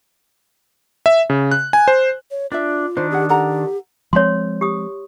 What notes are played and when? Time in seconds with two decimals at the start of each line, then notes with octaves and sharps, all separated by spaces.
1.06 E5
1.30 C#3
1.51 F#6
1.73 G#5
1.88 C5
2.31 C#5
2.52 D4 F4 D5 E5
2.97 D#3 D4 C5
3.11 D#4 G4 G#4 F#5
3.29 G4 A4 F#5 A#5
4.13 F3 G#3 C4 C#5 C6
4.61 G4 D#6